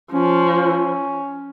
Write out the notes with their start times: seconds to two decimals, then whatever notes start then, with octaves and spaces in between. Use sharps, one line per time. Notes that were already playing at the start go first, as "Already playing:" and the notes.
0.13 F3 C#4